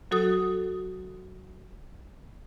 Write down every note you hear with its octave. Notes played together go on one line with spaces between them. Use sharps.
F#3 F#4 A4 D#6